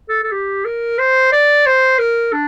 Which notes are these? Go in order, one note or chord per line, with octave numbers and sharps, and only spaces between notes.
A4
A4
G4
A#4
C5
D5
C5
A#4
D4